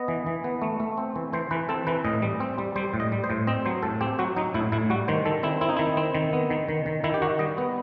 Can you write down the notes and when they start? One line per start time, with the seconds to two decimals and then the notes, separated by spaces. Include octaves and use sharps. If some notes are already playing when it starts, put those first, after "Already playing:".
Already playing: B3 D#5
0.08 E3
0.26 E3
0.44 B3
0.62 A3
0.80 A3
0.98 C4
1.16 E3
1.33 E3 C5
1.51 E3 B4
1.69 C4 A4
1.87 E3 B4
2.05 A2 D#5
2.22 G3
2.40 C4
2.58 G3
2.76 G3 C5
2.94 A2
3.00 D#5
3.12 G3
3.24 C5
3.30 A2
3.47 C4 D#5
3.65 F#3 C5
3.83 A2 A4
4.01 C4 G4
4.19 F#3 F#4
4.36 F#3 D#4
4.54 A2 E4
4.72 A2 E4
4.90 G3 F#4
5.08 D#3 C5
5.25 D#3 A4
5.43 C4 E4
5.61 C4 E4
5.69 D#4
5.77 D#3 E4
5.97 C4
6.15 D#3
6.33 B3
6.50 D#3
6.69 D#3
6.86 D#3
7.04 D#3 E4
7.14 G4
7.22 D#3 F#4
7.39 G3 D#5
7.58 B3